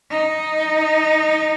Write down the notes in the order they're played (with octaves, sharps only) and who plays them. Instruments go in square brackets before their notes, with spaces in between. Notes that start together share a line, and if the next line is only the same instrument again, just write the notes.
[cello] D#4